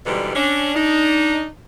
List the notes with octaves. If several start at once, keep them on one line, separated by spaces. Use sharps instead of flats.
G#2 B2 D3 E3 G3
C#4 D4
D4 D#4